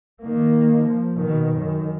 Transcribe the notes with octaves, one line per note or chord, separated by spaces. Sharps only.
D#3 A#3
F3
B2 D#3
F#2 D#3